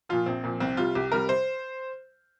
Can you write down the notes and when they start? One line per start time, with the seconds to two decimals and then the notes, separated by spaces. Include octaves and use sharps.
0.09 A#2 F3 F4
0.26 A#1 C4
0.44 A#2 F3
0.60 C2 C4
0.77 C3 G3 F4
0.95 C2 G4
1.12 C3 G3 A#4
1.29 C5